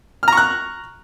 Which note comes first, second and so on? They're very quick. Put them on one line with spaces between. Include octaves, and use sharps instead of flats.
F6 A#5 C#6 F#6